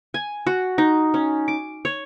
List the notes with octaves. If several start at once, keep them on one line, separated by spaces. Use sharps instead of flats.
G#5
F#4
D#4
C#4
D6
C#5